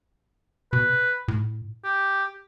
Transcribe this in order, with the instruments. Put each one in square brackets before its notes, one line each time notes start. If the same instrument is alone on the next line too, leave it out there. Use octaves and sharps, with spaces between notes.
[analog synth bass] B2 [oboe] B4
[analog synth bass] A2
[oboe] G4